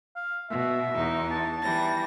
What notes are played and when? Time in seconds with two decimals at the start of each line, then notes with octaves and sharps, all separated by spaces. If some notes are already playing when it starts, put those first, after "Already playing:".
0.16 F5
0.50 B2 E5
0.94 E2 D#4
1.31 A5
1.63 E3 G3 A#6